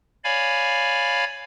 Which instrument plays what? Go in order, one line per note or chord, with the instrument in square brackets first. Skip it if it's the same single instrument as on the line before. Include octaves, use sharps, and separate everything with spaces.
[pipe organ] C#5 D5 F5 G#5 B5